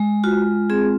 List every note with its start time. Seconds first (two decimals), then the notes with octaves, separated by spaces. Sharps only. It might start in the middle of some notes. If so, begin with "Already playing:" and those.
Already playing: G#3
0.24 F4 F#4
0.70 C4 G#4